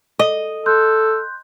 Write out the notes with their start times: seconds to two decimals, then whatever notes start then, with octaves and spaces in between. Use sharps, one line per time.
0.19 A4 D#5
0.66 A4 C6 F#6 G6